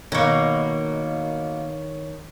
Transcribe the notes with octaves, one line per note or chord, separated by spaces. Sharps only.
B2 D#3 A#3 C#5 C#6